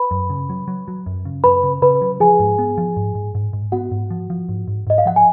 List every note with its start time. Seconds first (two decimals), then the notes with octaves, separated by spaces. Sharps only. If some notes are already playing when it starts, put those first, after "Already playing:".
Already playing: B4 B5
0.11 F#2
0.30 C#3
0.49 F#3
0.68 F#3
0.88 F#3
1.06 F#2
1.25 C#3
1.44 F#2 B4 B5
1.63 C#3
1.82 C#3 B4 B5
2.01 F#3
2.20 F3 G#4 G#5
2.40 G#2
2.58 B3
2.78 F3
2.97 G#2
3.15 G#2
3.35 G#2
3.53 G#2
3.72 B3 F#4 F#5
3.91 G#2
4.10 F3
4.30 F3
4.49 G#2
4.68 G#2
4.87 G#2 D#5
4.98 F5
5.06 F3 F#5
5.16 G#5